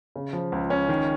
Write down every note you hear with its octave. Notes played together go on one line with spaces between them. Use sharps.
C#3
F3
C#2
C#4
D#3